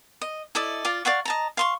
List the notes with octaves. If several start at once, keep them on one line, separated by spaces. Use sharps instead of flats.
D#5
E4 A4 D5 D#5
F4 D5 D6
D5 F5 F#5 C#6
D#5 A5 A#5
F5 C6 C#6